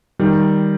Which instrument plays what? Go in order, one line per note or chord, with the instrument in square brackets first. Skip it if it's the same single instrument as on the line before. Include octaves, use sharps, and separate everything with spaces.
[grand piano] D#3 G3